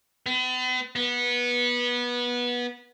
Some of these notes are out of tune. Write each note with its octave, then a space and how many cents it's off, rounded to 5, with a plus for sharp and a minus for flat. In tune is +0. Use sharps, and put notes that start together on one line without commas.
B3 +45
B3 -20